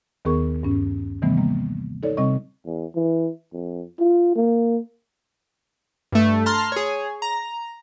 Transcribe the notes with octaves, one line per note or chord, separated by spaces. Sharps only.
D#2 D#3 B3 G#4 A#4 C#6
G2 C#4
C3 D#3 E3 G3 A3 B3
G3 A#3
D#4 A4 C#5 D5
C3 G3 C4 D#5 C#6
E2
E3
F2
F4
A#3
G2 A3
A5 A#5 C6 F6
G#4 C#5
A#5